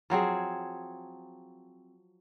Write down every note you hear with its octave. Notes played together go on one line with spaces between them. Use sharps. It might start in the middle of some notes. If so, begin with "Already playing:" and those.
F3 F#3 C4 G#4